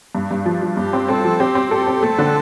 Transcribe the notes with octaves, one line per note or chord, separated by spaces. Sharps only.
G2
G2
F3
F3
G2 G4
C4
C4 A4
F3
C4 G4
C4
G4 A4
C4
A3 A4
D3